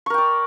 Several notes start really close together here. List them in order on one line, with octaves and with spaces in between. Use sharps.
C#6 A#4 G5 D5